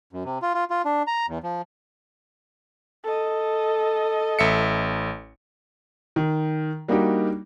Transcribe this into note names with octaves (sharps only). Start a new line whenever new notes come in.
F#2
C3
F4
F4
F4
D4
A#5
E2
F3
A4 D#5
A1 E5 C#7
D#3
G3 A#3 D4 D#4 F#4 G4